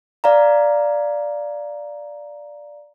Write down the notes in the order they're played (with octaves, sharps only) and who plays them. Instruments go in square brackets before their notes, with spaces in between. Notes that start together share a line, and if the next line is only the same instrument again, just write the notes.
[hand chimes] D5 F5 A#5